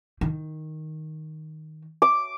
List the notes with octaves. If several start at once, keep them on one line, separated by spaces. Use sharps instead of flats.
D#3
D6